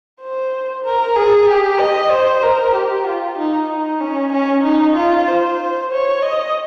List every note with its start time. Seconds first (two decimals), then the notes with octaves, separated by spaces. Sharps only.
0.21 C5
0.85 A#4
1.16 G#4
1.48 G4
1.79 D#5
2.11 C5
2.43 A#4
2.75 G4
3.06 F4
3.38 D#4
3.69 D#4
4.01 C#4
4.32 C#4
4.64 D#4
4.96 F4
5.27 C5
5.91 C#5
6.22 D#5